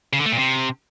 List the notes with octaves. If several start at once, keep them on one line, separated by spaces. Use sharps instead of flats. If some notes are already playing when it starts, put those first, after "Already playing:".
C#3
D3
A3
A#2
C3